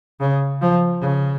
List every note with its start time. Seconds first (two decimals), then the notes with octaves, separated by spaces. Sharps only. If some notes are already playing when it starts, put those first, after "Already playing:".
0.20 C#3
0.62 F3
1.01 C#3